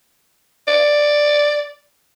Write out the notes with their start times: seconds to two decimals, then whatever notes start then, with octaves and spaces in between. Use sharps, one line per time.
0.68 D5